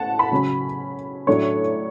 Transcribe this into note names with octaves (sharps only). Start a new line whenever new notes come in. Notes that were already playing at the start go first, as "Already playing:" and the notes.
Already playing: A2 A3 C#4 F#5 A5
B5
C#3 F#3 C#4
A2 F#3 A3 D4 C#5